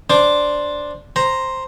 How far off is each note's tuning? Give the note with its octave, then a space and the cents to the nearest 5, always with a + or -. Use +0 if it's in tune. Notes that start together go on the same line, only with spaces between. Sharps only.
D4 +0 C5 +0 D6 +0
C5 +0 A#5 +0